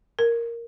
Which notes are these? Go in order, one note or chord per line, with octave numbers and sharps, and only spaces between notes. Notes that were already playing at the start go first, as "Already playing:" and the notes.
A#4